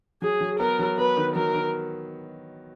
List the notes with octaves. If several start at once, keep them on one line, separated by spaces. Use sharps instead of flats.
F#3 G#4
F#3
B3 A#4
F#3
B3 B4
D#3
F#3 A#4
D#3